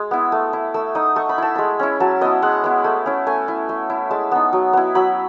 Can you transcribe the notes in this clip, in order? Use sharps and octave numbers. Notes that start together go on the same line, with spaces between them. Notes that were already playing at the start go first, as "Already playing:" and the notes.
Already playing: G#3
B3 E4
A3
E4
A3 E6
D#4 D#6
A3 C#6
B5
E4 A5
G#3 B5
C#4 E4
F#3 A5
B3 E4 D#5
G#3 F#5
B3 E4
A3
C#4 E4
A3 G#5
E4
A3
E4
G#3 A5
B3 D#4
F#3
B3 E4
F#3 B5